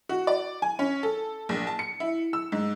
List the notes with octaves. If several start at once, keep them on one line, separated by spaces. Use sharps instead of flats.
F#4
D5
G#5
C#4
A4
A#1
A5
C#7
E4
E6
G#2